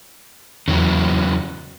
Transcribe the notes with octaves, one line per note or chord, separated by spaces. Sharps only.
E2 C#3 E3 F#3